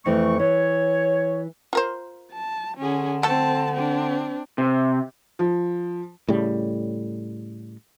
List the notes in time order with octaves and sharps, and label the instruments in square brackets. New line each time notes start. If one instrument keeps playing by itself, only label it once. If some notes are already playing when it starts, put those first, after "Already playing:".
[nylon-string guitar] F2 E3 [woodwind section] A3 C#6
[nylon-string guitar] E3 [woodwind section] C#5
[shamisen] F4 A#4 C5
[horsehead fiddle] A5
[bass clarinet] D3 [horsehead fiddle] C#4 G#4
[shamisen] A3 A4 [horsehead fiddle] C4 A5
[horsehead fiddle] C4 D4
[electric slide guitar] C3
[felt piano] F3
[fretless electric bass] A2 C#3 G3